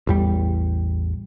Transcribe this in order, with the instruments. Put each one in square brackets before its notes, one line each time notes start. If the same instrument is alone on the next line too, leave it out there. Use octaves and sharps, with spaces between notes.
[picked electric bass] A1 E2 G3